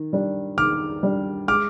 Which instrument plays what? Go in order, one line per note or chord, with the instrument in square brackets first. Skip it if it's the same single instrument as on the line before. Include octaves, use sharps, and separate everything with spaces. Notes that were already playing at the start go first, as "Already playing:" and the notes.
Already playing: [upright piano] D#3
G3 D4
[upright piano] D#3 [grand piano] D6 F6
[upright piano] G3 D4
[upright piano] G#3 [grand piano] D6 F6